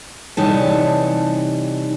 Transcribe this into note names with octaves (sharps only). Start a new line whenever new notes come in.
C3 E3 G3 D#4 C#5 A5